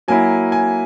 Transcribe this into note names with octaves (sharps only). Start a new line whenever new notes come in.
F#3 A#3 E4 G#5
G#5